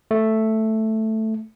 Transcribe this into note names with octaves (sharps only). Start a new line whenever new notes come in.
A3